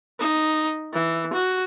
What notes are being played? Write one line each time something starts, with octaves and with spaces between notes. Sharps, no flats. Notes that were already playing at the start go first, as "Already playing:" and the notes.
D#4
E3
F#4